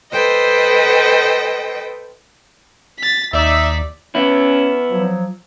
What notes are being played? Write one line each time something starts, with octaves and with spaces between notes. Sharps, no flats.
A4 B4 C5 D#5 G5
A6 B6
D#2 D#4 D5 E5 B6
B3 C#4 E4
F3 F#3